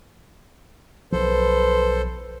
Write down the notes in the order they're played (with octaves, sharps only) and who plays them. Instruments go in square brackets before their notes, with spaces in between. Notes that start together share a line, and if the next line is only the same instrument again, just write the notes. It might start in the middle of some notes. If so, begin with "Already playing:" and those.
[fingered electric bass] B1 F3 [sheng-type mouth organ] A4 C5 [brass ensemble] B4